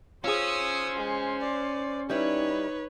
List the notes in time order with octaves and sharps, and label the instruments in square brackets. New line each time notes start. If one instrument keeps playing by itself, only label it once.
[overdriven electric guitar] C#4 [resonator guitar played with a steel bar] F4 G#4 [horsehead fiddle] C5 [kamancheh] D#6 E6
[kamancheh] G#3
D5
[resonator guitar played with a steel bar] G3 E4 [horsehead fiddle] D#4 [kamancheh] B4 C#5